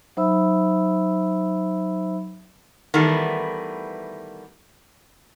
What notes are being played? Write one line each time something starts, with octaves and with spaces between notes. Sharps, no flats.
F#3 D#4 C5 E5 B5 E6
D#3 E3 G3 A3 B3